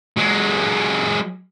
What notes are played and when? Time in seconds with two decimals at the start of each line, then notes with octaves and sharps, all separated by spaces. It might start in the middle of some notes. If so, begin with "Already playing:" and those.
0.18 F#3 G#3